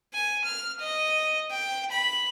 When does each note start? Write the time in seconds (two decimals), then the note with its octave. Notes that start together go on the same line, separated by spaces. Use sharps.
0.13 G#5
0.44 F6
0.79 D#5
1.50 G5
1.91 B5